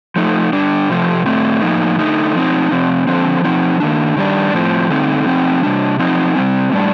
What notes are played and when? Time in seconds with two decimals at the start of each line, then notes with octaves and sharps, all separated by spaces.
0.16 F3 A3 D#4
0.53 D3 G3 D4
0.89 C3 F3 A3
1.25 A2 A3 C4
1.62 A2 F3 A#3 D#4
1.99 D3 A3 D#4
2.35 F3 C4 D#4
2.71 C3 F3 C4
3.07 D3 F3 C4
3.44 F3 C4 D#4
3.80 D#3 A#3 D4
4.17 D#3 G3 D4
4.53 A2 F3 C4
4.90 D3 A3 C4 D#4
5.26 F3 C4 D#4
5.63 C3 G3 D4
5.99 F3 C4 D#4
6.35 C3 G3 C4
6.72 A2 G3 D4